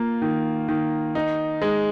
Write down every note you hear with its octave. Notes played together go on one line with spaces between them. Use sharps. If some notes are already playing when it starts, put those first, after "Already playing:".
Already playing: A#3 F4
D#3
D#3
D#4
G#3